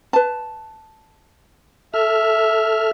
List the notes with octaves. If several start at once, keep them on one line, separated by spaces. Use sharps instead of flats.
B4 A5
A4 E5 F6